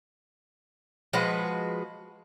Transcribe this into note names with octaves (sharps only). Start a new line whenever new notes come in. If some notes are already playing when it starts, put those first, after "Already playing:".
F3 G#3 F#4 B4